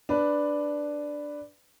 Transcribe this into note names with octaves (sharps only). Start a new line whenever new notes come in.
D4 B4